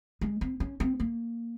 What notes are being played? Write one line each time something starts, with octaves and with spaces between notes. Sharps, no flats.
G#3
C4
C#4
C4
A#3